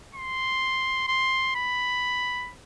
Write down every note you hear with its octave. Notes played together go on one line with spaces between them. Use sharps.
C6
C6
B5